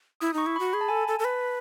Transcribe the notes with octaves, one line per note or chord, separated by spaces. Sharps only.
E4 D#6
D#4 C#6
E4
F#4 B5
G#4 B5
A5
A4 G#5
A5
A4
A4
B4